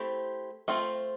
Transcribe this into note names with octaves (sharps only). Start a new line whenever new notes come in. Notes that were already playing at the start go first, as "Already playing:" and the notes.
Already playing: A3 C4 E4 G4
A3 C4 F4